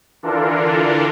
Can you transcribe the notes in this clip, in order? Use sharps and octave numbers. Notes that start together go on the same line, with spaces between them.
D3 E3 D4 F4 A4 A#4